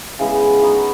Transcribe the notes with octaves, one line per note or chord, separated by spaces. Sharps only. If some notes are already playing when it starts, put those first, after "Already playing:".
C#3 E3 G#3 B3
F#3 B3 D#4 F#4